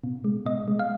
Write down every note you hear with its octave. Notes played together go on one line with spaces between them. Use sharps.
B2
G#3
B2 D#5
G#3
F5